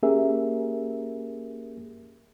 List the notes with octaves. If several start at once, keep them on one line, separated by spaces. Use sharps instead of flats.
A#3 C#4 G4 G#4 A#4 E5